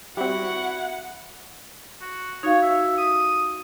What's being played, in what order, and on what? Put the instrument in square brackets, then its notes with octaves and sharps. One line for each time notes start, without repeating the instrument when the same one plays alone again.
[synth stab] G3 C4 [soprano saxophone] E4 [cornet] F#4 [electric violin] F#5
[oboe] F#4
[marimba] D#4 F#4 F5 [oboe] C#5
[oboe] E5
D#6